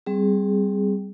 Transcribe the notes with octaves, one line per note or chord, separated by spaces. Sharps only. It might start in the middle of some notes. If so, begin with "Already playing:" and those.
G3 C4 G#4